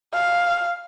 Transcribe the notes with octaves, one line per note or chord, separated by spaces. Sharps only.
F5